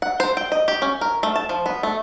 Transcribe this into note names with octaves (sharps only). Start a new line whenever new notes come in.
F#5
C5
G5
D#5
G4
C#4
A#4
A3
A5
F3
B3
A3